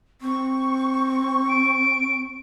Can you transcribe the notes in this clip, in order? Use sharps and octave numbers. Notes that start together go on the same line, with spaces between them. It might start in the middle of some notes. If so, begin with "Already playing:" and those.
C4 C#6
D7